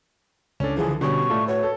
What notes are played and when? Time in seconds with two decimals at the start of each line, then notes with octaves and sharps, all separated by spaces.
0.60 C#2 C#4 D4 A4
0.77 D3 E3 F3 G#4
1.01 B2 D3 G3 C#4 C#6
1.30 A2 A3 F4 A4 D5
1.48 F#4 B4 C#5
1.63 A4